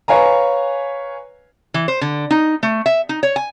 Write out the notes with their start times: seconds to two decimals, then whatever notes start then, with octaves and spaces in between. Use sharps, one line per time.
0.08 B4 C#5 F5 G#5 A#5
1.74 E3
1.88 C5
2.01 D3
2.31 D#4
2.63 A3
2.86 E5
3.09 D#4
3.23 C#5
3.36 G#5